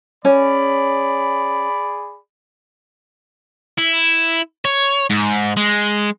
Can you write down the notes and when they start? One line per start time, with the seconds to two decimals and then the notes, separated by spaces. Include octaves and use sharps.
0.25 C#4 G#4 D5 B5
3.78 E4
4.65 C#5
5.10 G#2
5.57 G#3